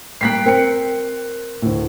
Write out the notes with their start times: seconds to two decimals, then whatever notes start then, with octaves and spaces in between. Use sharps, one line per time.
0.21 G3 A#3 G5 F#6 B6 C7
0.46 C4 A#4 C#7
1.62 D2 A2